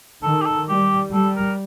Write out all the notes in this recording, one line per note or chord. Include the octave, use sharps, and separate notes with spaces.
D#3 A4
G4
A4
G3 G4
G3 A4
A#4